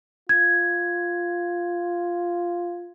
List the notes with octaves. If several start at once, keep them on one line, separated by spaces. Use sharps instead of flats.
F4 G#6